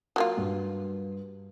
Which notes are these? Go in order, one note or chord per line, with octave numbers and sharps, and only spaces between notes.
F#3 A#3 F4
G2